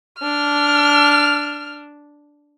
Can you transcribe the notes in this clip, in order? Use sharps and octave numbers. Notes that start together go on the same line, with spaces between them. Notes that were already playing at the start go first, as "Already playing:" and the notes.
D4 F6